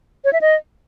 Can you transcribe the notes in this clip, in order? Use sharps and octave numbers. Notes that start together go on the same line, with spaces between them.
C#5
E5
D#5